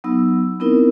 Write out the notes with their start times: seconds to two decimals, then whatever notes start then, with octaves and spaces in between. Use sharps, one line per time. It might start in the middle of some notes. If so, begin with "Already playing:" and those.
0.04 F#3 B3 D#4 E6
0.60 B3 C4 D#4 E4 A#4